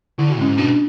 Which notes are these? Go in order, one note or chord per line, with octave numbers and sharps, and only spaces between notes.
D3 E4
F#4
G#2 C#4 E4
B2 D4 F#4